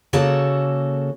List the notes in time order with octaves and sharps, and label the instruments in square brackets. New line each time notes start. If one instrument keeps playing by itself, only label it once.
[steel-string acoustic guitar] C#3 A#3 F#4 A4 A5